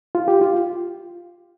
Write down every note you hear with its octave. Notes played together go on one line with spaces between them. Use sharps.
F4
G4
F4